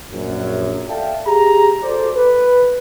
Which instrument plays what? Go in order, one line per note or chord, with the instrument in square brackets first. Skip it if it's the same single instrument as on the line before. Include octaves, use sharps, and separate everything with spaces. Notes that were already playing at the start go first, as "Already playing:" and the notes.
[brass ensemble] A#1 F#2
A4 D5 E5 F5 G5 A5
G4 G#4 A#5
F#4 A4 C5 D5
B4